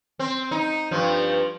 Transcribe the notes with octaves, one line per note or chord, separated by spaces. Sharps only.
C4
D#4
G2 F3